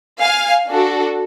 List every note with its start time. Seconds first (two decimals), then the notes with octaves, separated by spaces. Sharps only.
0.20 F5 G#5
0.68 D4 F#4 A4